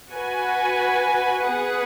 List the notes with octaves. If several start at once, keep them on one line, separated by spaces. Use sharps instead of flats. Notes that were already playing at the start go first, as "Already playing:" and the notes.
F#4 B4 G#5
B3 G#4 B4 F#5